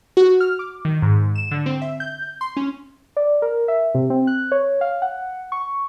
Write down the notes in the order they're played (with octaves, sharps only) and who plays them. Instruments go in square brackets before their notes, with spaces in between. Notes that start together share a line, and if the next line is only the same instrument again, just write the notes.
[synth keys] F#4
F6
D6
D#3
G#2
E7
D3
C4
E5
G6
C6
C#4
D5
A#4
E5
C3
C4
F#6
C#5
F5
F#5
C#6